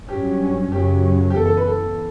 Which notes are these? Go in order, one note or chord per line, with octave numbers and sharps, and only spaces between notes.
G2 F#3 C#4 G4
F#2 C#3 F#3 C#4 G4
G4
F#2 E3 B3 A4
A4
B4
A4